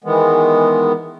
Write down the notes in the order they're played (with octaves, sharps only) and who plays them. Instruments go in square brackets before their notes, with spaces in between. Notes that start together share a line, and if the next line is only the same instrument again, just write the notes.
[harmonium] D#3 E3 G#3 B3